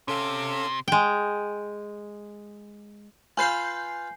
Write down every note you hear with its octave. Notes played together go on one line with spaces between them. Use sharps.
C3 C#4 A4 F5
G#3 G5
F4 B4 F5 G#5 G6 C7